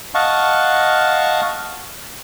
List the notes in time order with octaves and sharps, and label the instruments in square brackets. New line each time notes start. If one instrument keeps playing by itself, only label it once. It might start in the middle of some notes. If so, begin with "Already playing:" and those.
[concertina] D#5 F5 F#5 A5 C#6